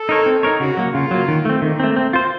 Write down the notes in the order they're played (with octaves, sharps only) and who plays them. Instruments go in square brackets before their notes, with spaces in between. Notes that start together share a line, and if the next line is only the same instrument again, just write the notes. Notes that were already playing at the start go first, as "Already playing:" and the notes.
Already playing: [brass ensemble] A4
[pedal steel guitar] D#4 A#4 C#5
C4
D#4 A#4 C#5
[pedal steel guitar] C#3 [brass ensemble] F#4
[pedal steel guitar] F#3 A#3
[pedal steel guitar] C#3 [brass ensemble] F4
[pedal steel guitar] F#3 A#3
D#3
A3 C4
[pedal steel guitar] D#3 [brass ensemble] A#3
[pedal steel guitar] A3 C4
C4
F4 C5